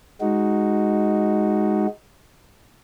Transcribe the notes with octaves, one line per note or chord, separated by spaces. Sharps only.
G#3 D#4 F#4